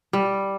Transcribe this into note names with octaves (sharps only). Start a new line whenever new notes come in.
G3